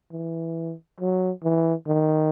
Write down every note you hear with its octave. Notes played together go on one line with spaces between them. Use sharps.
E3
F#3
E3
D#3